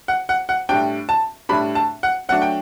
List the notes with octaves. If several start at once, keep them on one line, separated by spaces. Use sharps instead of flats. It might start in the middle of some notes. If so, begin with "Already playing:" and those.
F#5
F#5
F#5
A2 G3 D4 G5
A5
A2 G3 D4 B5
A5
F#5
F#3 A3 D4 F#5
G5